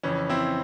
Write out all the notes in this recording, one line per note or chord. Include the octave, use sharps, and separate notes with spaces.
F2 C#3 E3 C#4
C4 E4